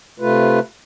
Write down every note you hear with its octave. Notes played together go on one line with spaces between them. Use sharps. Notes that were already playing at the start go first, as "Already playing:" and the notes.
C3 A3 F4 B4